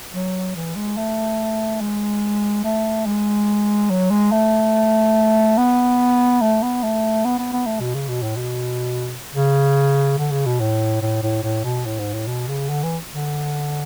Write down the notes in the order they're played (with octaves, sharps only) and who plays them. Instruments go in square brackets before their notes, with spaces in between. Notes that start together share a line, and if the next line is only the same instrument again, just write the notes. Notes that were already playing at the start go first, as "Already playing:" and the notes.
[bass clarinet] F#3
E3
G#3
A3
G#3
A3
G#3
F#3
G#3
A3
B3
A3
B3
A3
B3
B3
B3
A3
B2
C#3
B2
A2
B2
C#3
D3
C#3
B2
A2
A2
A2
A2
B2
A2
G#2
A2
B2
C#3
D3
E3
D3